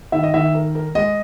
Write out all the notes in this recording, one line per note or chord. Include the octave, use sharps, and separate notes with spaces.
D#3 E5
D#5
D#3 E5
A#4
A#4
G#3 D#5